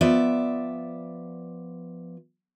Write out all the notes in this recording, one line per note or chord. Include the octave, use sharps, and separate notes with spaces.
F3 B3 D5 E5